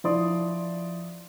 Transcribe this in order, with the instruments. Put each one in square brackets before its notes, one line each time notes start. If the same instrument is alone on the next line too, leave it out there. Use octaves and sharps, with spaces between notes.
[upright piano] F3 E4 D5 C6 D#6